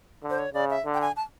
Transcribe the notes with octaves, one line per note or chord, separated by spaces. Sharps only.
D3
C5
C#5
C#3 D5
E5
D3
G5
G#5
A5